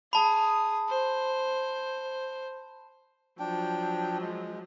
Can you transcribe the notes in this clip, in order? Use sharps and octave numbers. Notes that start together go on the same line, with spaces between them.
G#4 A5 B5 D#6
C5
F3 F#3 D4 G5
G#3